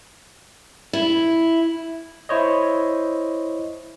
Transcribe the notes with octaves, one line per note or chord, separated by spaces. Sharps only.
E4
E4 C5 C#5 D#5